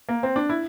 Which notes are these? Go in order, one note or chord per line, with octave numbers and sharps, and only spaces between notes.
A#3
C4
D4
E4